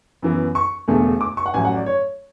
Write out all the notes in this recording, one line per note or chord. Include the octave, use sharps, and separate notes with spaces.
F#2 E3 B3
C#6
E1 E2 D3 A3
D6
C#6
F#5
A1 A2 F#3 G#5
F#5
D5
C#5